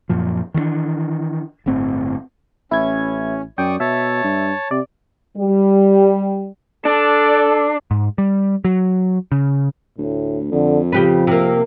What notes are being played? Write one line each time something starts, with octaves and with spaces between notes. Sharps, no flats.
F#2 A#2 F3
D#3 E3 A3 D4
G1 A2 C4
A1 C#4 E4 G#6
F#2 D5 G5 C#6 D#6
B2 C#5 E5 A5
G2
C3 D5
G3
D4 A4 D5
G#2
G3
F#3
C#3
D2 A2
F2 D3
C#3 F3 G4 B4
C3 A#3